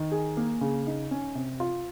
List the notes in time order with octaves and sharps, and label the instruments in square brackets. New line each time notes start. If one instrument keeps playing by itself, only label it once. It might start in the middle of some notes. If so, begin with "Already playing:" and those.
Already playing: [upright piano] D#3
G#4
A#3
C#3
D#4
C#4
C3
F4